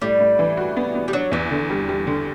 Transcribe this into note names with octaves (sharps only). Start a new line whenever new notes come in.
A2 G3
A2
E3
F#4
B3
B3
G3
F#3 D4
E2 E3
D3
G3
G3
D3